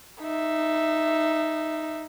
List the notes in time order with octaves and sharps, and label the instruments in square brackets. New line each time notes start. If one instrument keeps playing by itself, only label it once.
[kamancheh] D#4 E5